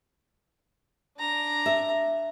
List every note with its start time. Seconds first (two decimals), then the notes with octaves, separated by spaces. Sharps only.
1.18 D4 A#5
1.66 E5